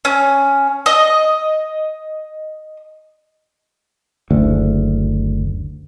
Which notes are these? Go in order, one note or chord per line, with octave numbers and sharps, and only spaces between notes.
C#4
D#5
F#1 D2